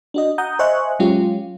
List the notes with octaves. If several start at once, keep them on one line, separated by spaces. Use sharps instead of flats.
D4 F#4 D#5
F#5 A#5 D#6 G6
C5 D#5 E5 G#5 C#6 F#6
F#3 G#3 C#4 F4 G4